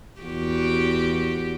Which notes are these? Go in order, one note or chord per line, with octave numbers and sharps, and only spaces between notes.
E2 F#4 G4